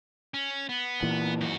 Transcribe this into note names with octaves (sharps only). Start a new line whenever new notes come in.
C#4
B3
A#2 E3
F#2 F#4